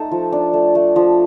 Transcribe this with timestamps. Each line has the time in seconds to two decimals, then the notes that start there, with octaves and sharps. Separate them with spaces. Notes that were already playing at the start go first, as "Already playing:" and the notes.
Already playing: A3 D#4 A4
0.12 F3
0.32 D4
0.53 A3
0.75 A3
0.96 F3